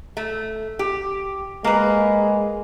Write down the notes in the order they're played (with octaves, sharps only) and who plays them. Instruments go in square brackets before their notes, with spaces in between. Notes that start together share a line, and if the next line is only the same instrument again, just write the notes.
[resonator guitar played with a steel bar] A3
G4
[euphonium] G#3 [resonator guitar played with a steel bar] A#3 B4